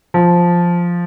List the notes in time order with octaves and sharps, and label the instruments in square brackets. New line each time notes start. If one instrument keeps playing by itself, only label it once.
[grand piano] F3